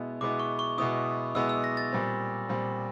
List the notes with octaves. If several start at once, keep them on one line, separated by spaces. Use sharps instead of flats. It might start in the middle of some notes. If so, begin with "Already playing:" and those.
Already playing: B2 G#3 B3 E4
B2 G#3 B3 E4 D6
C#6
C#6
B2 G#3 B3 E4 D#6
B2 G#3 B3 E4 E6
E6
A#6
A6
A#2 G3 C4
A#2 G3 C4